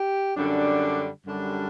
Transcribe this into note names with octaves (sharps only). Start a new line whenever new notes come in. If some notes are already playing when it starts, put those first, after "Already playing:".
Already playing: G4
F#2 D3 G3 D4
F#2 D3 G3 D4